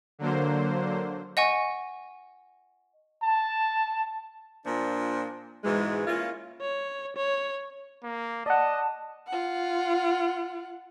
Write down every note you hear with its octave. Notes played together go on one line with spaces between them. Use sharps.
D3 F#3 A#3 C5
D#5 F#5 G#5 C#6
A5
A#2 F3 D4
G#2 B2 E3 G#3
A#3 C#4 E4 F4
C#5
C#5
A#3
D5 D#5 F#5 A5
F4 F#5